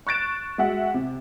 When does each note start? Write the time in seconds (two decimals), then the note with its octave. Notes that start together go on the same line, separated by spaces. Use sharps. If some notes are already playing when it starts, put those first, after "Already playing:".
0.07 C#6 F#6 A6 D7 E7
0.58 G#3 F#4 E5 F#5
0.94 C3